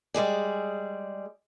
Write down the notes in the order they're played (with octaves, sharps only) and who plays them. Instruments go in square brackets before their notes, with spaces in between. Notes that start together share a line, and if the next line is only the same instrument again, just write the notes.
[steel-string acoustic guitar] G3 G#3 G#4 D5